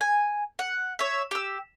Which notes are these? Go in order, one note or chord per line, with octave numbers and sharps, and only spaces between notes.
G#5
F#5
C#5 E5
G4 E6